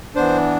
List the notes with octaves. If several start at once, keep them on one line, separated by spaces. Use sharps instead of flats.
E3 B3 D4 C5